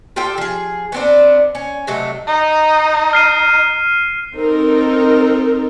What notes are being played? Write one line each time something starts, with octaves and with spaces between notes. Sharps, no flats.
F4 G4 A4 G5
F3 G#4
B3 C4 D4
C#4
C3 F#3 A3 D#5
D#4
F6 C7 D#7
C4 D#4 A4 A#4